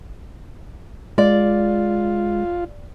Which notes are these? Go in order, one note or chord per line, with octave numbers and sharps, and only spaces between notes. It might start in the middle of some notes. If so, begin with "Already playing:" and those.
G#3 F4 D5